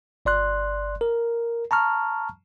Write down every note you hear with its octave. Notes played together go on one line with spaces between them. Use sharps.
G1 D5 C6 F#6
A#4
A5 A#5 C#6 F6